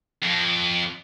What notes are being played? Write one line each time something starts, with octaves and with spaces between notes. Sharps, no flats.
F2